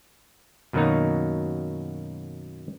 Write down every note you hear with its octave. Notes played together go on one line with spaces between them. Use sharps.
F#2 B2 D#3 F#3 A#3 D#4